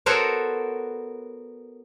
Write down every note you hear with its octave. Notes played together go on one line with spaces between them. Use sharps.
B3 F#4 A4 A#4 C5 C#5